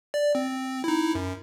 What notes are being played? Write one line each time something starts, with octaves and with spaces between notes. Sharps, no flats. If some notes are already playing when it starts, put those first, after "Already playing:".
D5
C4
D#4 E4
F#2